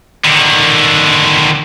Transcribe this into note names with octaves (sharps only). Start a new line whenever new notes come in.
D3 D#3